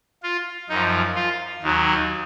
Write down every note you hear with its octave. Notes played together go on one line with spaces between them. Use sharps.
F4
F#2 F3 D#4
F4
D#2 D#3 F#3